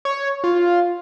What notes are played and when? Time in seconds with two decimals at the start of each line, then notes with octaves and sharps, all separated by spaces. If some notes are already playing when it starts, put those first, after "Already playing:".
0.05 C#5
0.44 F4